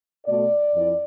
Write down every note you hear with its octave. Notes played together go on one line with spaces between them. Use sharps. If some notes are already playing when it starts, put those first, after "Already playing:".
B2 A3 D5
F2 E3